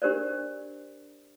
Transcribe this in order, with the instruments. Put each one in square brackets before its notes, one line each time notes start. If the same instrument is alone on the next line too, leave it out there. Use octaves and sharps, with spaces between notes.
[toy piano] D4 G4 A#4 C5 D5